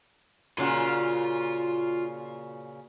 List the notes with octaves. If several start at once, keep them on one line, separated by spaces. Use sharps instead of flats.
A#2 C#3 F4 F#4 C6